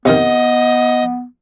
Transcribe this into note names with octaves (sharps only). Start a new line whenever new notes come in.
C3 D#3 B3 D#5